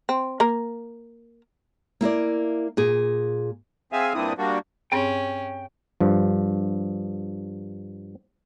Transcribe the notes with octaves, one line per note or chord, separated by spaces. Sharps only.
C4
A#3 A#4
A#3 E4 A#4 D5
A#2 G#4
C4 G#4 E5 F5 G#5
G2 A#2 C4 D4 E4 D#6
G3 A#3 D4 F#4
G2 C4 C#4 G#4 G5
G2 F3